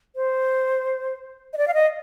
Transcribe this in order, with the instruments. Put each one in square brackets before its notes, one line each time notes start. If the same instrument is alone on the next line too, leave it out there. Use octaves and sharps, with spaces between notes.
[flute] C5
D#5
D5
F5
D#5